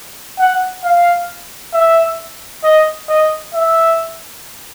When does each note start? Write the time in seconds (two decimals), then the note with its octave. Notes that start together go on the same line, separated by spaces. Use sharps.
0.39 F#5
0.84 F5
1.74 E5
2.64 D#5
3.09 D#5
3.55 E5